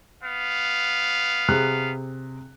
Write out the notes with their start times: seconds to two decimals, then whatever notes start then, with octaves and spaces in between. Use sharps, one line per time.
0.22 B3 F5
1.48 C3 G#4 F#6